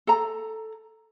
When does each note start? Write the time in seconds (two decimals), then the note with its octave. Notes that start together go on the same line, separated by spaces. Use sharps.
0.07 A4 A#5